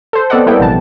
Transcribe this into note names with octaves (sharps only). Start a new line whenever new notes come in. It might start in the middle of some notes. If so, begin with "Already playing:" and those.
A4 C5
B3 C4 A4 D5 D#5 F#5
G3 A#3 B3 E4 A4 G5
A#1 C3 E3 A5